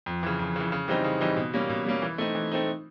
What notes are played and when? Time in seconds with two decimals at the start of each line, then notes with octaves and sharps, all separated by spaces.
0.06 F2
0.23 C#3 E3
0.39 F2
0.56 C#3 E3
0.72 C#3
0.88 E3 G3 C4 D#4
1.04 C#3
1.21 E3 G3 C4 D#4
1.36 B2
1.53 G3 A#3 C#4
1.69 B2
1.86 G3 A#3 C#4
2.02 E3
2.18 A3 C4 D#4
2.35 E3
2.52 A3 C4 D#4